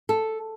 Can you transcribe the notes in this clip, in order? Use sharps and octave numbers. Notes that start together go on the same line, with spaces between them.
A4